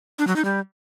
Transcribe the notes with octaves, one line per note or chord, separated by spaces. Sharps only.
D4
F#3
D#4
G3